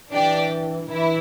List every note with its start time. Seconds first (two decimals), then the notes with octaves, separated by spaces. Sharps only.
0.12 E3 D4 G4 D5 G5
0.90 E3 E4